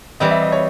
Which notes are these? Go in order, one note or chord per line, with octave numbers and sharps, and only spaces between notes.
E3 G3 C4 D#5
E5
D#5
C#5